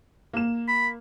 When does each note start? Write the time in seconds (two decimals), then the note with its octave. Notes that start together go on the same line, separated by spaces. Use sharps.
0.33 A#3 E7
0.68 B5